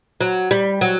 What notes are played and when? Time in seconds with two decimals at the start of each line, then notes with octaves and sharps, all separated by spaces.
0.21 F#3
0.51 G3
0.81 F#3